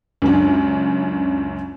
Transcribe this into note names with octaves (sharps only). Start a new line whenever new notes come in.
C#2 F#2 D4